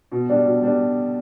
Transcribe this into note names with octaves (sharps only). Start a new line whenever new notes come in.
B2
G3 D4
B2
G3 D4